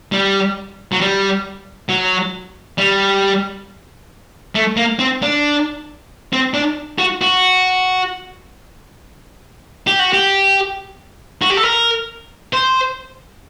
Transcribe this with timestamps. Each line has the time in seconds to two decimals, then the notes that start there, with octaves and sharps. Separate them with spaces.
0.12 G3
0.92 F#3
1.01 G3
1.89 F#3
2.78 G3
4.55 A3
4.77 A#3
4.99 C4
5.22 D4
6.33 C4
6.54 D4
6.98 F#4
7.22 F#4
9.87 G4
9.99 F#4
10.13 G4
11.42 F#4
11.50 G4
11.57 A4
11.63 A#4
12.53 C5